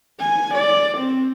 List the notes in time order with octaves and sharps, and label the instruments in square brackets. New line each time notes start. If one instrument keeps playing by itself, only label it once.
[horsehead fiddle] G#5
D5
C4